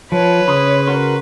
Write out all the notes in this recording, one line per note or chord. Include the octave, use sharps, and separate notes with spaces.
F3 B4 C#5
C#3 B5 C6 D#6
F#4 A#4 C6